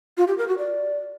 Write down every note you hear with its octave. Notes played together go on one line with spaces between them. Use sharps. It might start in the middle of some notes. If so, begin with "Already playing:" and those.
F4
G4
A#4
F#4
D5